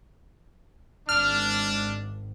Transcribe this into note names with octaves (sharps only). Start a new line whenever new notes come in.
G#1 D4 F6